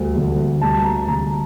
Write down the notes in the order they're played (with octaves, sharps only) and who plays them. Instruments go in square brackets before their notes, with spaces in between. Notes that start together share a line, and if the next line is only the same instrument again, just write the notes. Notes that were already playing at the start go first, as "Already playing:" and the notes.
Already playing: [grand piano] D2 D3 G3
D2 D3 G3
D2 D3 G3 A5
A#5
A5
D2 D3 G3 A#5